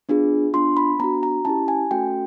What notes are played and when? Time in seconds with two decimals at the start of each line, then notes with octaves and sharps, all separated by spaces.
0.09 B3 D4 F4 G#4
0.54 B3 D4 F4 C6
0.77 B5
1.00 B3 D4 F#4 A#5
1.23 A#5
1.45 C#4 E4 G4 A5
1.68 G#5
1.91 A3 C#4 F#4 A4 G5